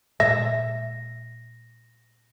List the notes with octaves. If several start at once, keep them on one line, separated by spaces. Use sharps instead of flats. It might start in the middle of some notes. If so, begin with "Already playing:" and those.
A#2 G#3 E5 A#6